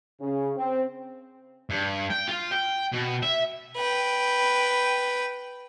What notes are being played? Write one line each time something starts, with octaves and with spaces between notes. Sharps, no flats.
C#3
C4
G2
G5
F4
G5
B2
E5
B4 G5